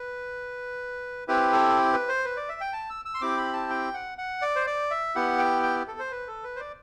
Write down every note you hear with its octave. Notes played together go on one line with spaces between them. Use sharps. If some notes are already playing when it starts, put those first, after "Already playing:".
Already playing: B4
C4 E4 G4 B4
A4
B4
C5
B4
D5
E5
G5
A5
E6
E6
C6
C4 E4 G4 D6
B5
A5
G5
F#5
F#5
D5
C5
D5
E5
B3 E4 G4 F#5
G5
G5
A4
C5
B4
A4
B4
C5
D5